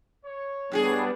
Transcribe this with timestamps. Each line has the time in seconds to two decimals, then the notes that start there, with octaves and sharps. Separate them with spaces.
0.25 C#5
0.72 A2 G3 B3 D4 G4 G#4